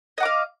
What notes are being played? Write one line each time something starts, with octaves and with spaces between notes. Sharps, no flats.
D#5 F5 F#5 D6